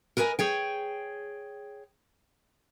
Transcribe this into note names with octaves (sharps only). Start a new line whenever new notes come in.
A#4 B4 D#5 G5 G#5
G#4 C#5 G5